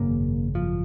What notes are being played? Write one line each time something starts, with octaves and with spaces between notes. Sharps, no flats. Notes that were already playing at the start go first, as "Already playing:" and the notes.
Already playing: G#1 F#2 C#3 A#3
F3